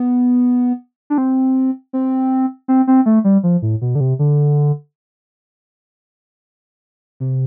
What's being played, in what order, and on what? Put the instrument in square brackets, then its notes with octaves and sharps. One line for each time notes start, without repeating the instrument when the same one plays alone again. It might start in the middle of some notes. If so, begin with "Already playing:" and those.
Already playing: [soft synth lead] B3
D4
C4
C4
C4
C4
A3
G3
F3
A2
B2
D3
C3
D3
C3